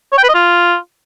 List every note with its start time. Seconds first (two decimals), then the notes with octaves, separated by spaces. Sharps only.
0.12 C#5
0.18 G5
0.23 B4
0.29 D#5
0.34 F4